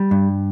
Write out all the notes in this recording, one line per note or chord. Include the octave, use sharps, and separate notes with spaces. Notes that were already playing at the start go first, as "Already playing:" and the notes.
Already playing: G3
G2